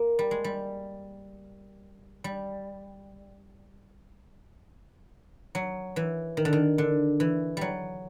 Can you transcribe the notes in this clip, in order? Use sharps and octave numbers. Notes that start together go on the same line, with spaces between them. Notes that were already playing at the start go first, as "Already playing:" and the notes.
Already playing: A#3
G3
G#3
G3
G3
F#3
E3
D#3
D3
D#3
D3
E3
F#3 G3